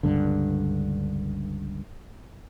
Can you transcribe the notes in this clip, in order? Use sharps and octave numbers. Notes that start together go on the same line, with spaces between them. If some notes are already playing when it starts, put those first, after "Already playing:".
C#2 G2 D3